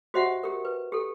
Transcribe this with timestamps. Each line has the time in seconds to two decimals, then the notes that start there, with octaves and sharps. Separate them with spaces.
0.14 F#4 G4 C5 D#5 E5 F#5
0.43 G4 A#4
0.65 B4
0.92 G4 A4